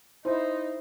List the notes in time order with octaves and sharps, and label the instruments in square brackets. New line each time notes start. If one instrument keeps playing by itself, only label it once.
[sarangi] D#4 [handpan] E4 C5